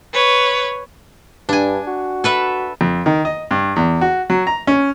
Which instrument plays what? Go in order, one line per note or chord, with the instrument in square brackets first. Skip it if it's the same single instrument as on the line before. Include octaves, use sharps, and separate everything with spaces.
[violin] B4 C#5
[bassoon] G2 [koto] D4 G#5
[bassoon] F#4
[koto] A4 B4 E5
[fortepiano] F2
D#3
D#5
G2
E2
F#4
F#3
A#5
C#4